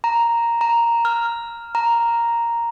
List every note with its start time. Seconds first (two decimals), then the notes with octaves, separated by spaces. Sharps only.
0.04 A#5
0.61 A#5
1.05 F6
1.75 A#5